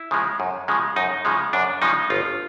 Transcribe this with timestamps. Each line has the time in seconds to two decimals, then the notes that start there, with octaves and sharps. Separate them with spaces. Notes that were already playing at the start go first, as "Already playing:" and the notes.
Already playing: E4
0.11 C#3 F3 G#3
0.40 F#2
0.68 C#3 F3 G#3
0.96 F#2 D#4
1.25 C#3 F3 G#3
1.53 F#2 D4
1.82 C#3 F3 G#3 D#4
2.10 G1 F4